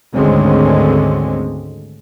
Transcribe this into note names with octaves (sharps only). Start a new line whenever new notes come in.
G#1 D2 D3 G#3 C4 C#4